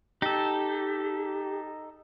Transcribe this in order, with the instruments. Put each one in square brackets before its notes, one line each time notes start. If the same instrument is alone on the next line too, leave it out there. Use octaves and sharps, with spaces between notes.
[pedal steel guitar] D#4 A4 [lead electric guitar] G4